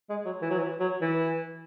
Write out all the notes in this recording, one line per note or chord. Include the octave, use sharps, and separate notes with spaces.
G#3
F#3
E3
F#3
E3
F#3
E3